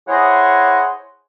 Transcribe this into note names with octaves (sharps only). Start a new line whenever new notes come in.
E4 G#4 C5 C#5 D#5 F#5